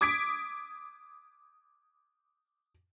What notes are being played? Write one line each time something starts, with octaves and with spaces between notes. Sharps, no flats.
D6 D#6 G#6 B6 D7